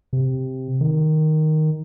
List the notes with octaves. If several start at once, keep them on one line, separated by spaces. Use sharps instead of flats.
C3
D#3